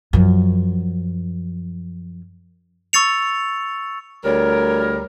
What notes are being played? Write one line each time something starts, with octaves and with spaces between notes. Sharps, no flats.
F#2 F3
C#6 E6 A6 C#7 F7
D2 G3 A#4 C#5